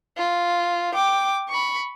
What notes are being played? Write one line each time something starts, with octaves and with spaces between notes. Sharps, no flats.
F4
G5 D6
B5 C#6